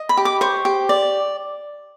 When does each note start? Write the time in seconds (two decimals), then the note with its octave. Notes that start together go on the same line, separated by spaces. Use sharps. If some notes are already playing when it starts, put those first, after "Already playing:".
Already playing: D#5
0.09 B5
0.17 G4
0.25 D6
0.41 C5 C#6
0.65 G4
0.89 D5